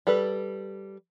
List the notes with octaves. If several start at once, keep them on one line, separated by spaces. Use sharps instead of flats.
G3 A4 B4